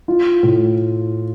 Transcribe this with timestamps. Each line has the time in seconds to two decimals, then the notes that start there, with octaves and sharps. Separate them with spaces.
0.08 F4
0.43 A2